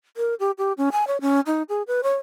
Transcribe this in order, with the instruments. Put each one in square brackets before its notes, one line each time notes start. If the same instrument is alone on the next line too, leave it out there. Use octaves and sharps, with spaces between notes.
[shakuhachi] A#4
G4
G4
C#4
G#5
C#5
C#4
D#4
G#4
B4
C#5